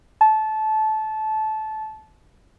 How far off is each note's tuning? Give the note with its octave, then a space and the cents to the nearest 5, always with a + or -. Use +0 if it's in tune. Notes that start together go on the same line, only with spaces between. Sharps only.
A5 -20